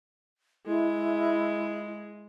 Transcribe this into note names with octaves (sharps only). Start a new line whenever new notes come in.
G#3 E4